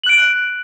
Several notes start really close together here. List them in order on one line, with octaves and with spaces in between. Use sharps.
F#7 F#6 D7